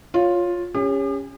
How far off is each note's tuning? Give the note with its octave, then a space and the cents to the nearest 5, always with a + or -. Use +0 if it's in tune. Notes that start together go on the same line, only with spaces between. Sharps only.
F4 +10 C#5 +0
C#4 +0 G4 +45